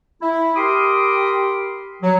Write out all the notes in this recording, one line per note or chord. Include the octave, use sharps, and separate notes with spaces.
E4
G4 A#4 B5 C6 D6 D#6
F#3